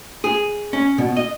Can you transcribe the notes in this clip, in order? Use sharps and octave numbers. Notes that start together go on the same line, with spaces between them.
G#4
C#4
B2
D#5